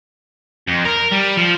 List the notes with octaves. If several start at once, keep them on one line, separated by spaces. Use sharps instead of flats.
F2
A#4
G3
F3